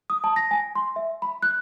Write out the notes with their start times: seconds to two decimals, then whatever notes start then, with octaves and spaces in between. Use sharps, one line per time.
0.10 D#6
0.24 A5
0.36 A#6
0.51 G#5
0.75 C6
0.96 E5
1.22 B5
1.43 F#6